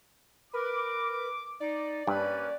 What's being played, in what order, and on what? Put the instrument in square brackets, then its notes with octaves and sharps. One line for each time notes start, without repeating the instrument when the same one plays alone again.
[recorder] A#4 [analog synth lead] B4 [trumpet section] D6
[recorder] D#4 [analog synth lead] D5
[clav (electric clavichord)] G2 [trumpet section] A#3 C#4 G4 [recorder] B4